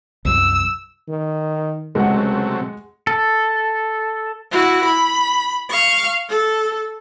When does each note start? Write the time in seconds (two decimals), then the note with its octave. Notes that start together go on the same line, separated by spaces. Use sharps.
0.25 C2 F#2 E6
1.08 D#3
1.95 C#2 C3 F#3 G#3 A3 F#5
3.07 A4
4.51 E4 F#4
4.85 B5
5.70 F5 C#6
6.30 A4